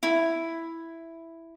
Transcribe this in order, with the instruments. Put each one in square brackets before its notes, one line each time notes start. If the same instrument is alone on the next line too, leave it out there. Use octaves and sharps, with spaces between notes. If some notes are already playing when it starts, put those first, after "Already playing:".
[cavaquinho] E4